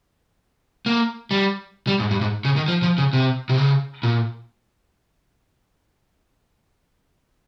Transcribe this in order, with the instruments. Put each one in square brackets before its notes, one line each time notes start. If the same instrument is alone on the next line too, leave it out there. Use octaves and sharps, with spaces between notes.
[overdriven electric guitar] A#3
G3
G3
G#2
G2
G#2
C#3
D#3
F3
F3
C#3
C3
C3
C#3
A#2